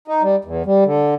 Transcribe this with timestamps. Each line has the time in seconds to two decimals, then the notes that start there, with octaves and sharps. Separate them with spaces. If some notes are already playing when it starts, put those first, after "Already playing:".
0.08 D#4
0.22 G3
0.45 E2
0.66 G3
0.85 D3